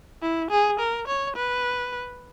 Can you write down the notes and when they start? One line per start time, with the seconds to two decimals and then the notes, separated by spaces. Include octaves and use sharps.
0.22 E4
0.51 G#4
0.80 A#4
1.08 C#5
1.36 B4